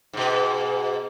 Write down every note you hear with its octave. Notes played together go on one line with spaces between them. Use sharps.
G#2 B2